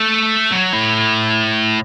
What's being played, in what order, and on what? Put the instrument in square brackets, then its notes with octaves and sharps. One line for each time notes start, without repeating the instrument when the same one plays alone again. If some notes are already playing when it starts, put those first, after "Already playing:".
Already playing: [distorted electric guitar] A3
F#3
A2